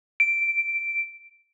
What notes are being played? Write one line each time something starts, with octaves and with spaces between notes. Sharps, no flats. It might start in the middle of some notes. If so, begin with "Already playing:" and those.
D7